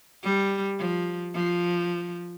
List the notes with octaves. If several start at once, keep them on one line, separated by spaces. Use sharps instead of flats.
G3
F3
F3